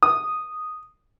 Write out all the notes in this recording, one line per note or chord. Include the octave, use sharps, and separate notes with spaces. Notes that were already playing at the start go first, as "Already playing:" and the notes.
D#6